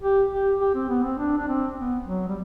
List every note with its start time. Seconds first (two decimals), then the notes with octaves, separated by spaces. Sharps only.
0.02 G4
0.31 G4
0.60 G4
0.75 C4
0.90 B3
1.04 C4
1.18 D4
1.38 D4
1.48 C4
1.78 B3
2.07 F#3
2.28 G3